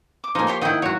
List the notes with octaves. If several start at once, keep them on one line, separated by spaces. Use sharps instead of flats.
D6
F3 A#3 D#4 G#5
G4 C#5 C6
D#3 E4 D#5 F#5 G5
F#3 F#4 C#5